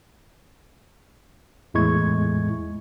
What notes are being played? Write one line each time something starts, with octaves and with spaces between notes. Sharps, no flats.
E2 A2 G#3 E4 C#6 G#6